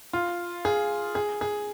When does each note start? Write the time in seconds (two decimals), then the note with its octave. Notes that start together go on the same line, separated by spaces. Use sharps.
0.13 F4
0.65 G#4
1.15 G#4
1.41 G#4